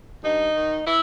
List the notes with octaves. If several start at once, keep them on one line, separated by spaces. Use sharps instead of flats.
G2 D#4
D#3
E4